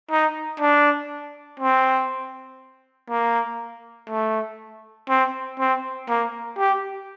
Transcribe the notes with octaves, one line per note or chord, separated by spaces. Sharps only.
D#4
D4
C4
A#3
A3
C4
C4
A#3
G4